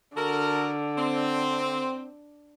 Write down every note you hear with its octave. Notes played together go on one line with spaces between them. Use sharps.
D3 F#4 A4 A#4
C4